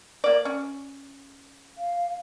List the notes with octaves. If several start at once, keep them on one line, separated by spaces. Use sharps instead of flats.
A#3 D5
C#4
F5